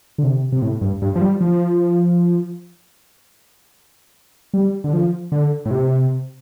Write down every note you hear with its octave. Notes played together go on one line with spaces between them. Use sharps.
D3
C3
C3
A2
G2
G2
F3
G3
F3
G3
D3
F3
D3
A2
C3